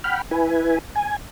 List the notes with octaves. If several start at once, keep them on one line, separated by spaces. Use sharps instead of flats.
F#5 G5 B5 F6
E4 B4 G#5
G#5